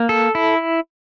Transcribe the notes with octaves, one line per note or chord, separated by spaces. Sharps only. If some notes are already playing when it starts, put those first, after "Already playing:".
Already playing: A#3
A4
E4